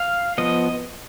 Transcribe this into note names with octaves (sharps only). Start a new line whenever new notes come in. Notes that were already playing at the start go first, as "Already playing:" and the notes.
Already playing: F5
F3 B3 D#5